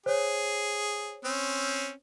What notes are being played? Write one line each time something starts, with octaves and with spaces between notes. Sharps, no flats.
G#4 C5 C#5
C4 C#4